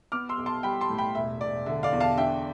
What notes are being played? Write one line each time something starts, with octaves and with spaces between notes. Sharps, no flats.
B3 D6 F6
C6 E6
B1
A5 C6
G3 G5 B5
A5 C6
A2
G5 B5
E1 E5
E1 D5
D3 E5
D5 F5
E2
F5 A5
D4 E5 G5